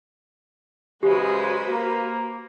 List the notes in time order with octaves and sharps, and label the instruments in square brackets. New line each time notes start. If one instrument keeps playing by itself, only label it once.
[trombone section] F#2 C#3 G#3 [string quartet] F#4 B4 C5 [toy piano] G4
[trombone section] A#3